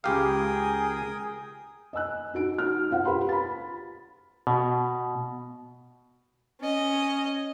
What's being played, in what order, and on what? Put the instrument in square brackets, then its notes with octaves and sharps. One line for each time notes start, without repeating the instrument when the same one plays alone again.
[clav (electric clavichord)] C#2 G4 F5 [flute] G#4 [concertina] A#4 G5 D#6
[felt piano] D#5 G#5 E6 F#6
D#4 F#4 D7
D#4 F#4 F6
F4 C5 F5 F#5
F4 G4 B4 B5 C6
B5 A6
[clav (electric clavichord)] B2
[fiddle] C#4 D#5